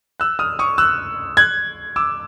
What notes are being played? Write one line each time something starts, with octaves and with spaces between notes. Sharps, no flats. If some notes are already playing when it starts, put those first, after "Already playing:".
E6 F#6
D#6 F6
C#6 D#6
E6 F#6
F#6 G#6
D6 E6